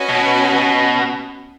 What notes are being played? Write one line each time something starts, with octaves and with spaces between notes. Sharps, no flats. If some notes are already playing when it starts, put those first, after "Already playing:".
Already playing: C#4 F#4 B4 D#5 G#5
B2
B2